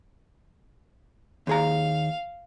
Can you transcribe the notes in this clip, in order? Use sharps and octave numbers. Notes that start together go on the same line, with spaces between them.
D#2 G#4 F5 A#5